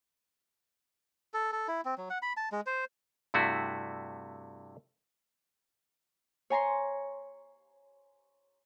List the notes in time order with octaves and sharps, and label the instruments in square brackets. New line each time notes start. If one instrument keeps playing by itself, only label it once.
[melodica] A4
A4
E4
C4
F#3
F#5
B5
A5
G#3
C5
[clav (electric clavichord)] G2 C3 A3 E4 F#4
[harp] C#5 G#5 A#5 C6